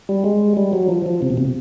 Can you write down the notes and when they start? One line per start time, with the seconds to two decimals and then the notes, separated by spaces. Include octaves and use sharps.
0.09 G3
0.24 G#3
0.57 G3
0.73 F#3
0.89 F3
1.06 F3
1.22 C3
1.30 B2
1.37 C3